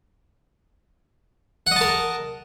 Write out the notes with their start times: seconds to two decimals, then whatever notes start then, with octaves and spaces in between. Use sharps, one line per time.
1.67 F#5
1.71 D#5
1.76 A5
1.81 A#4